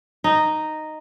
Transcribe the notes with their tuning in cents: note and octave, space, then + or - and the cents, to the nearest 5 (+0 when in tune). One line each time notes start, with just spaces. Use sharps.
D#4 -5